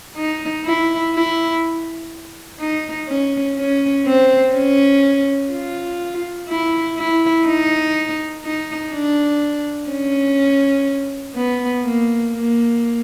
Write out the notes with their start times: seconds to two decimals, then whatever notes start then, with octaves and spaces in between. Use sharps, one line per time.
0.16 D#4
0.65 E4
1.14 E4
2.60 D#4
3.08 C#4
3.57 C#4
4.06 C4
4.54 C#4
5.51 F4
6.49 E4
6.97 E4
7.46 D#4
8.44 D#4
8.92 D4
9.89 C#4
11.35 B3
11.84 A#3
12.32 A#3